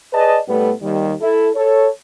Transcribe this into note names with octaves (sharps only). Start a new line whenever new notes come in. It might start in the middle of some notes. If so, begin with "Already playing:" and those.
G#4 B4 D5 D#5 A5
A2 G3 A3 B3
D#2 D#3 G3
E4 A4
A4 C#5